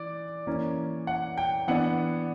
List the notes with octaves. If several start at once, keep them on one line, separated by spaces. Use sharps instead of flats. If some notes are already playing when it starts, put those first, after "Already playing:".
Already playing: E3 D5
E3 A#3 C#4
F#5
G5
E3 B3 D4 F#5